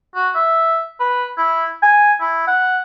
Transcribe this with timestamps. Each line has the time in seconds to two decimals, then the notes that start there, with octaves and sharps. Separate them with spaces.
0.15 F#4
0.35 E5
1.00 B4
1.38 E4
1.83 G#5
2.20 E4
2.47 F#5